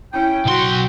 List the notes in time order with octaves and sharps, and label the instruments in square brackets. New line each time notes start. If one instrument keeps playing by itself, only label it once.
[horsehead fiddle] C#4 E4 [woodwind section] G5
[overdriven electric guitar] B1 C6 [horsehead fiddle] F#4